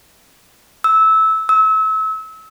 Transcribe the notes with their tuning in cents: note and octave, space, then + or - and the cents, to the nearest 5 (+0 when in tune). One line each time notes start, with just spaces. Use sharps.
E6 -15
E6 -30